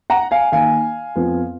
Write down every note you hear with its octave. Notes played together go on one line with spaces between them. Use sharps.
F#5 A#5
F5 G#5
D#3 A#3 D#4 F5 G#5
F2 F3 B3 F4